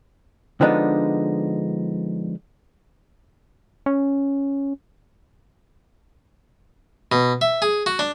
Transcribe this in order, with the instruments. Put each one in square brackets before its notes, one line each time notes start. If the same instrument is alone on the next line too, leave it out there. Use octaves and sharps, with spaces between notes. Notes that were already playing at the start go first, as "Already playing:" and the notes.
[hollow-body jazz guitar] D3 F3 G#3 B3 D4 D#4
[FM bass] C#4
[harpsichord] B2
E5
G#4
F#4
D4